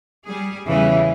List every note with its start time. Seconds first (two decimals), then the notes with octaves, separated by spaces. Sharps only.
0.25 G3 G#4
0.66 E2 C#3 E3 G3